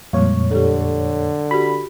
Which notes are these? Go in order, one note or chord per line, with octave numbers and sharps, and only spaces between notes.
F2 A#2 G3 G#3 C#5
D3 G4 A4
F#4 G4 B5